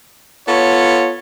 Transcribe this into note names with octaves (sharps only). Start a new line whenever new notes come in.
B3 F4 A4 C#5